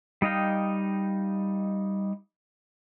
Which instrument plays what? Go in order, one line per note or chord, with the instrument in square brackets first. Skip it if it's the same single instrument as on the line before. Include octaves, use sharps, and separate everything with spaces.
[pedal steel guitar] G3 D#4 D#5 F5 G5